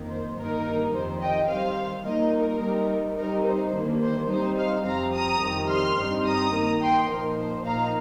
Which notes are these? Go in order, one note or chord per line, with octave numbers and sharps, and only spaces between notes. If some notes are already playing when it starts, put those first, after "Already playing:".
Already playing: F2 D#3 A#3
C5
G2 D#3 A#3 D#4 A#4
F2 C3 D#3 C5
D#5 G5
C3 D#3 G3 C5 F5
A#2 G3 A#3 D#4 A#4 D#5
A#4
C3 G3 D#4
C3 G3 D#4 A#4
C5
G2 D#3 A#3
C5
C3 G3 D#4 C5
C5 F5
F2 C3 F3 C4 F5 A#5
A#5 D#6
F2 C3 D#3 G3
C6 F6
G2 G3 C4 D#4
A#5 D#6
D#3 A#3 D#4
G5 C6
A#2 F3 A#3 D#4 A#4
C5
A#2 F3 A#3 D#4 F5 A#5